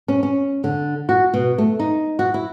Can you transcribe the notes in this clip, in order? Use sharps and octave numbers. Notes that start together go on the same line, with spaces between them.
C#4
C#4
D3
F#4
B2
A3
D#4
F#4
E4